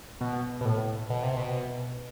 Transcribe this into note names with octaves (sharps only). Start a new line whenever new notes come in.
B2
B2
A2
B2
C3
B2